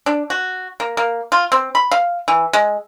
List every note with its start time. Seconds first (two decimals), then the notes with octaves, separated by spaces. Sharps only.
0.06 D4
0.30 F#4
0.80 A#3
0.97 A#3
1.32 F4
1.52 C4
1.75 B5
1.91 F5
2.28 E3
2.53 G#3